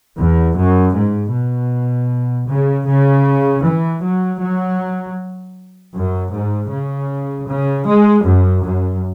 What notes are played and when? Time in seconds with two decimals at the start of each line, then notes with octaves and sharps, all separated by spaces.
0.18 E2
0.57 F#2
0.95 G#2
1.33 B2
2.48 C#3
2.87 C#3
3.64 E3
4.02 F#3
4.40 F#3
5.94 F#2
6.32 G#2
6.70 C#3
7.47 C#3
7.86 G#3
8.24 F#2
8.62 F#2